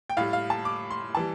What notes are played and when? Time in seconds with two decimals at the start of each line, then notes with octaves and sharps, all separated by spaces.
0.10 G5
0.17 A2 G3 F5
0.33 F5
0.50 A5
0.65 D6
0.91 C6
1.15 E3 G3 A5